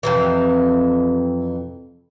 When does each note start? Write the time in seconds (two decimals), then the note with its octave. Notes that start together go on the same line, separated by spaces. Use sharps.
0.03 F2 C3 E3